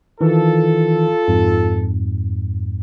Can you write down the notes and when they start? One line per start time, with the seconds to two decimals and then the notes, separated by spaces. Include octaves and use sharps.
0.21 D#3 E3 F4 A4
1.28 F2 G#2